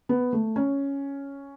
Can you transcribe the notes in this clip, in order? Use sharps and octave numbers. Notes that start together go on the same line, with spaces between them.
B3
A3
C#4